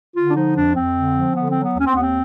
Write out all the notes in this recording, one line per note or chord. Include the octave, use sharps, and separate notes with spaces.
D3 F4
D4
F3 D#4
F2 D4
F2 C4
D3
F3
D3 B3
F#3 C4
B3
D#2
C#4
C4
D#2 B3
C4